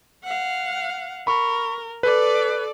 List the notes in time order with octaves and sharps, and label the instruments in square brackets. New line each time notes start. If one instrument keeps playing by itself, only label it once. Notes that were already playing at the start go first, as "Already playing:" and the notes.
[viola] F5 F#5
[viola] A#4 [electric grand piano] B5 C#6
[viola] A4 D5 [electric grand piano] B4